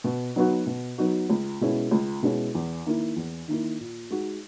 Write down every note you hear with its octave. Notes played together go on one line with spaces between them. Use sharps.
B2
F#3 B3 D#4 F#4
B2
F#3 B3 D#4 F#4
C#2
B2 G#3 C#4 E4
C#2
B2 G#3 C#4 E4
E2
D#3 A#3 E4
E2
D#3 A#3 E4
A#2
G#3 D#4 F#4